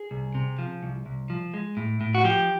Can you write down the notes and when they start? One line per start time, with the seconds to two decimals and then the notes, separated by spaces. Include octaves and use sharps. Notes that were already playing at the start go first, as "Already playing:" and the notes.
Already playing: G#4
0.11 C2
0.35 C3
0.59 F3
0.83 C2
1.06 C2
1.30 F3
1.54 G#3
1.77 A2
2.01 A2
2.15 F#4
2.24 F3 G4